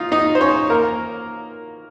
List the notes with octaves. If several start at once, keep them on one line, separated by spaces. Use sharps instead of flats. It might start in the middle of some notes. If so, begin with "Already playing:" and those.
Already playing: D#4 F4
D#4 D#5
C5
C#4 C#5
A#3 A#4